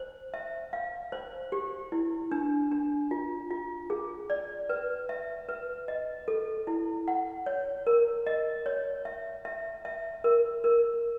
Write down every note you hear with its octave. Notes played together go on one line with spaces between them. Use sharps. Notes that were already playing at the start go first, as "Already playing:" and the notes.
Already playing: C5
E5
F5
C5
G4
E4
D4
D4
F4
F4
G#4
D5
B4
E5
B4
D#5
A4
E4
F#5
C#5
A#4
D#5
C#5
E5
E5
E5
A#4
A#4